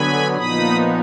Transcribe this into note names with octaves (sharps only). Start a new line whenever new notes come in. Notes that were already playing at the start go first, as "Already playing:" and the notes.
Already playing: D3 F#3 B3 G#5 B5
A#2 F3 B3 D#4 B5 D#6